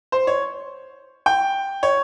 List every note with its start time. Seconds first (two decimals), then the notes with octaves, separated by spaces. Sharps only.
0.12 C5
0.27 C#5
1.26 G5
1.83 C#5